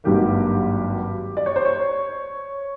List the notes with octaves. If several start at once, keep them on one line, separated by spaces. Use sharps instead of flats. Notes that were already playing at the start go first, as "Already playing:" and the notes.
G#1 G2 D#3 F#3 A#3 G4
D5
C#5
C5
C#5